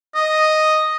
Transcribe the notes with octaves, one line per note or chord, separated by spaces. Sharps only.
D#5